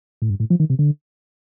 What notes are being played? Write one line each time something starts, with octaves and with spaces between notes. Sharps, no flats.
A2
G2
A2
F3
D#3
C3
D3